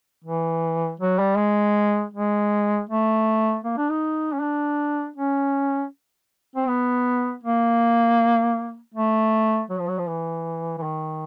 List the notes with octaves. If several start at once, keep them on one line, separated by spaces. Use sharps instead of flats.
E3
F#3
G3
G#3
G#3
A3
A#3
D4
D#4
C#4
D4
C#4
C4
B3
A#3
A3
F#3
F3
F#3
F3
E3
E3
D#3